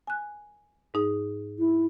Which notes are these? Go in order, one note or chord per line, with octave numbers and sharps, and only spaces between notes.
G#5 F#6
G#2 D#4 G#4
E4